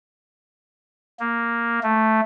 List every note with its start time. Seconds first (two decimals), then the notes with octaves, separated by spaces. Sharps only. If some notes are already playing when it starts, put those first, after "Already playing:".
1.20 A#3
1.83 A3